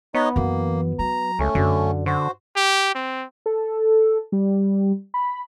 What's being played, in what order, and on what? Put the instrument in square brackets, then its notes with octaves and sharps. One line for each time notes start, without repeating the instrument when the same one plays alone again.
[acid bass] B3 [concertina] D#4 C#5 D#5
[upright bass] F#2 E3 [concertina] A#3
[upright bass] F#3 [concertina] A#5
[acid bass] C#2 [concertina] A3 C#4
[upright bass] F#2 [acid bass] D3
[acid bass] D3 [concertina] F#4 C5
[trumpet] G4
C4
[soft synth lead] A4
G3
B5